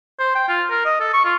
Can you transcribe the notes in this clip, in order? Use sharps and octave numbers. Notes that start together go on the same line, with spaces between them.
C5
G5
F4
A#4
D#5
A4
C#6
F4